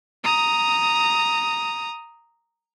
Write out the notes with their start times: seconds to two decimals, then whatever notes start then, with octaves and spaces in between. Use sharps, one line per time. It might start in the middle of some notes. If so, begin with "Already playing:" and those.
0.24 A#5 D#6